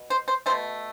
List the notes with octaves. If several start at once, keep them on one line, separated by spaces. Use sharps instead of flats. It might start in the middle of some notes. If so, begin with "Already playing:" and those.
Already playing: B2
C5
C5
B2 F#3 A3 C5